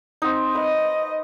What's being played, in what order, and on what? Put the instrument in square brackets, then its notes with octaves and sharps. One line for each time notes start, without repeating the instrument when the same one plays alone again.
[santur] C4 D#4
[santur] B4 [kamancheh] D#5